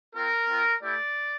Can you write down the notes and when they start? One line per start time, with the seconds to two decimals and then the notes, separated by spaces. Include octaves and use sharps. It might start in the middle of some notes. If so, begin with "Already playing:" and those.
0.15 C4 F4 A#4
0.48 C4 F4
0.81 A3 E4 G4 D5